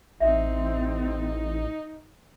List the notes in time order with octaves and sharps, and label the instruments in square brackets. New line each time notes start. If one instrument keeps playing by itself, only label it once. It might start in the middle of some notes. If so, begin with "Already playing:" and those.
[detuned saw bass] A1 [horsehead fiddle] C4 [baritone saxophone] D#4 [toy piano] E5